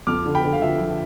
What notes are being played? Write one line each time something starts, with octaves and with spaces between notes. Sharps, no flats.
F2 D6 F6
D3
G5 B5
D3
F5
F3 E5
F3